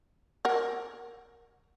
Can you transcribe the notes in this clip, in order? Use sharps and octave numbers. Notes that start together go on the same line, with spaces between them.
A#4 F#5